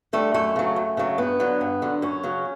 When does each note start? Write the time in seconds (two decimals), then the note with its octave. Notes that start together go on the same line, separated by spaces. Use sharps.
0.13 D3 G3 A3
0.34 F#2 A3
0.56 C#3 F#3
0.76 F#2
0.97 C#3 F#3
1.18 G2 B3
1.40 D3 F#3
1.61 G2
1.82 D3 F#3
2.02 F#2 C#4
2.23 C#3 F#3